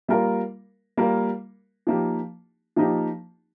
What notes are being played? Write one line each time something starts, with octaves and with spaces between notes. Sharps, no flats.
G3 A#3 F4 A#4
G3 A#3 F4 A#4
F3 A#3 D#4 G4
F3 A#3 D#4 G4